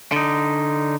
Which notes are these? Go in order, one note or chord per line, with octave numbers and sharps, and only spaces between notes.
D3 D#4